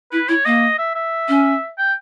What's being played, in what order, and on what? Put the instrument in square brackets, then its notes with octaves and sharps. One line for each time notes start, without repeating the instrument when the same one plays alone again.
[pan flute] E4 [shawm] B4
[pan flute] E4 [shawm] C#5
[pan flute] A#3 [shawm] D#5
[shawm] E5
E5
[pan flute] C#4
[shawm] G5